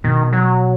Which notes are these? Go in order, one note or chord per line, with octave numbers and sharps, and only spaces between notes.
B2 D#3
F#3